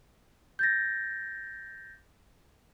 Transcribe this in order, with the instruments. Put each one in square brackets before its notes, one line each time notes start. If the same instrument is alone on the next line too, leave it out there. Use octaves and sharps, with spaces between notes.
[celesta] G6 A6 A#6